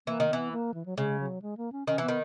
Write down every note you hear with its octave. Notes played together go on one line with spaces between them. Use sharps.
E3 A#3
D#3
E3 B3
A#3
E3
F#3
C#3 G#3
F#3
G#3
A#3
C#4
D#3 C#4
E3 B3
D#3